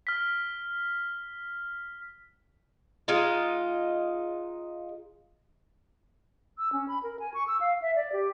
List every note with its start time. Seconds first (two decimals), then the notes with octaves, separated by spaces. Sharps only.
0.07 F6 B6
3.08 G#3 D#4 F4
6.58 E6
6.73 C#4
6.88 B5
7.03 A#4
7.20 G#5
7.34 C#6
7.47 E6
7.61 F5
7.82 E5
7.96 D5
8.12 G4